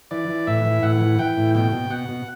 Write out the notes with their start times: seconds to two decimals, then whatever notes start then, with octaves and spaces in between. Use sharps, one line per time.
0.11 E3 D5
0.29 E3
0.47 A2 E5
0.65 E3
0.82 A2 F#5
1.01 E3
1.19 E3 G5
1.37 A2
1.55 B2 G5
1.72 B2
1.90 B2 F#5
2.09 B2